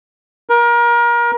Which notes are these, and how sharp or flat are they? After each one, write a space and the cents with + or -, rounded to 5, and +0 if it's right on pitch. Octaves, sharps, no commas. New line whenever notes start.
A#4 +30